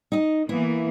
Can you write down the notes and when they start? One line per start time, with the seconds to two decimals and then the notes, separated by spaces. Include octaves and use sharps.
0.12 D#4 D#5
0.49 E3 A#3 B3 E4